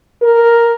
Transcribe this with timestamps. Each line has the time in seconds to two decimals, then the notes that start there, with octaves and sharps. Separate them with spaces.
0.22 A#4